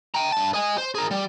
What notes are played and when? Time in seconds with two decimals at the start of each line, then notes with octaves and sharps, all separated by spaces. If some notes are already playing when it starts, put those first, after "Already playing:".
0.14 G5 A#5
0.32 G2 A5
0.54 D#5 G#5
0.78 C5
0.95 G#4 A#4
1.11 G3